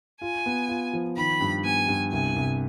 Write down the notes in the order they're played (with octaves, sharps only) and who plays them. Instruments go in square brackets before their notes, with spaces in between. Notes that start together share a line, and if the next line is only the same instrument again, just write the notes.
[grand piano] F4 [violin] G#5
[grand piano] B3
F4
F3
[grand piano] D#3 [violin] B5
[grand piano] G2
[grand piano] B3 [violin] G#5
[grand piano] G2
[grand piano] C2 [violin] G#5
[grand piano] C2